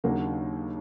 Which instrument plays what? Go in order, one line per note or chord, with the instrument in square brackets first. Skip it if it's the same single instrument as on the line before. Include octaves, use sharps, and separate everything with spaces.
[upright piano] D#2 C#3 F#3 A#3 D4